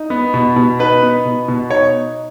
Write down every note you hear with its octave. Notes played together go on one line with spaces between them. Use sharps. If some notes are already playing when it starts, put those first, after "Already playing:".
Already playing: D#4
B3
B2
B2
D#4 B4
B3
B2
B2
D#4 C#5